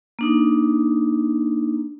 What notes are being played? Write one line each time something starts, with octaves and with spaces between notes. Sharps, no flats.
A#3 D4 D#4